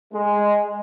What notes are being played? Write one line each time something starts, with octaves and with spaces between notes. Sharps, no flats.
G#3